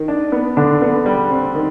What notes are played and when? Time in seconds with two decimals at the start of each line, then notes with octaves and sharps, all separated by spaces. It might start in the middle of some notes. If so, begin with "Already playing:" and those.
Already playing: D#3
0.08 D4
0.32 B3
0.57 D3 D4
0.82 B3
1.06 G3
1.30 C4
1.55 D#3